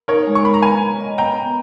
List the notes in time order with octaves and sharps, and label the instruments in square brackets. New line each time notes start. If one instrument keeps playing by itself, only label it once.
[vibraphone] D#4 [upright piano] A#4 C#5
[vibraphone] G#3
[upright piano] C#6
[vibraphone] G#3 [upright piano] B5
[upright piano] A#5
[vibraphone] B4 [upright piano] G#5 B5
[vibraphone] B4
D#5
[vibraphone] B3 [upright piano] G5 A#5
[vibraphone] B3